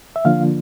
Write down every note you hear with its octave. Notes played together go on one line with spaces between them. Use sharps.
E5
D3 F3 A#3 D4 F4 F5